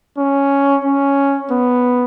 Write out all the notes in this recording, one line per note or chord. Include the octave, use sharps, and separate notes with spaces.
C#4
C#4
B3